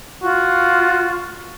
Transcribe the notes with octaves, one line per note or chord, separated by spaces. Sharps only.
F4 F#4